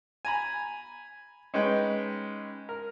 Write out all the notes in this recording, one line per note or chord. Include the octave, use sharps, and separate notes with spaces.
G#5 A#5 B5
G#3 C#4 D#4 B4 G5
A#4